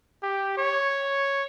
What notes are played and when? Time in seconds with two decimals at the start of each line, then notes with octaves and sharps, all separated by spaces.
0.23 G4
0.57 C#5